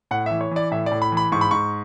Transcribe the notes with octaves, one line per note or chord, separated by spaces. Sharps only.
A2 F#5
E3 E5
C#5
E3 D5
A2 E5
D5
A2
B5
E3
B5
G#2 C#6
B5
G#2 C#6